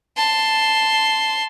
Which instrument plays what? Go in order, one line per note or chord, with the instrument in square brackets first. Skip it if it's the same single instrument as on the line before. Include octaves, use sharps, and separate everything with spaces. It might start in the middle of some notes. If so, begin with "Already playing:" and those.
[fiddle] A5 C6